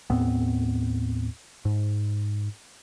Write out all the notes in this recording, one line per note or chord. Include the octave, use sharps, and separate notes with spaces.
D#2 A2 B3 C4
G#2